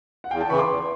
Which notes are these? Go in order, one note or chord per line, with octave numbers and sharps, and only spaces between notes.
F#5
E2 F5 G5
G5 A5
C#3 E3 B5 C#6
C6 D6
E2